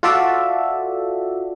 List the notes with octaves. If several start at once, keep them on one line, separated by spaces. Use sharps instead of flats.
F4 F#4 A4 D5 E5